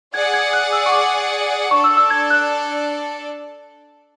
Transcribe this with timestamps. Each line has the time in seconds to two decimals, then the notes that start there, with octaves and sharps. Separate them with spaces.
0.14 G#4 D5 F#5 G#6
0.34 G#6
0.53 F#6
0.72 E6
0.86 C#6
0.92 D6
1.71 D4 A4 D5 C#6
1.84 E6
1.97 E6
2.10 G#6
2.30 F#6